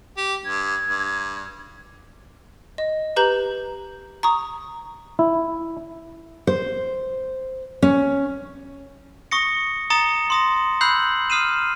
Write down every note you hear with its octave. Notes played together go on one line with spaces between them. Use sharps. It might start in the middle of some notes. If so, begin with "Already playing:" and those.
G4
G2 G#6
G2
D#5
G4 B4 A#5 G6 F#7
A#5 C#6 D#6
E4
C5
C#4
C#6 D#6 A#6 C#7
A#5 D#6 A6 C#7 E7 G7
C6 D#6 A#6
B5 E6 F#6 G6 C7 F#7
D#6 F6 C7 D#7 E7